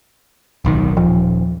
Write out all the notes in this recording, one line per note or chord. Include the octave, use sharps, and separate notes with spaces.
D1 B1 D#3
D#1 F3